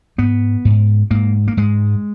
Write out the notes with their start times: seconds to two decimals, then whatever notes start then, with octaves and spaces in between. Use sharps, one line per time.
0.18 G#2 B3
0.65 G#2
1.11 G#2 A#3
1.48 A#3
1.57 G#2 G#3